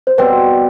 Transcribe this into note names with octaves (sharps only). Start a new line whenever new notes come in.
C5
B2 G3 C4 B4